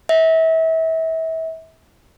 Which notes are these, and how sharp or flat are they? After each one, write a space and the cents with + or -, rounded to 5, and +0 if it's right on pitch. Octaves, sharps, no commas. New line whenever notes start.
E5 -30